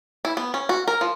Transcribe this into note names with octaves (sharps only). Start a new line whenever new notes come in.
E4
B3
C#4
F#4
A#4
F3